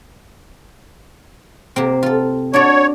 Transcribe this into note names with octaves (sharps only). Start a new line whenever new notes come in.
C3 A#3 C4
F4 A4
D4 F#4 C#5 D5